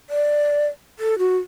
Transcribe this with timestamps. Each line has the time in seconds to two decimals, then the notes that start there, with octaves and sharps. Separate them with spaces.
0.10 D5
0.99 A4
1.19 F#4